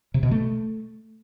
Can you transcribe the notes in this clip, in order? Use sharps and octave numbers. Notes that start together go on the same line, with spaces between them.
C3
B2
A3